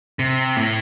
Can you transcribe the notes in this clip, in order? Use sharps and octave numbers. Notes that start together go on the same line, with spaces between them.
C3
A2